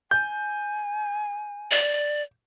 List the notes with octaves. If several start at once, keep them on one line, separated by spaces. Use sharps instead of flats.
G#5 G6
D5